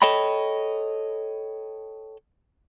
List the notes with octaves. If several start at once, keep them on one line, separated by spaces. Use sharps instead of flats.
A4 C#5 D#5 G5 B5